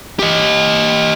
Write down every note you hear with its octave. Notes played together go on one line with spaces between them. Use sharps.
G4 D#5